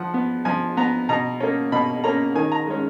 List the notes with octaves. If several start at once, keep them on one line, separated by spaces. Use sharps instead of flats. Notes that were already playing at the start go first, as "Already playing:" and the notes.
Already playing: F3 F#5
B3
F3 G#5
B3 A#5
B2 A#5
A#3 C#4
B2 B5
A#3 C#4 A#5
D#3 G#5
A#5
G#3 C#4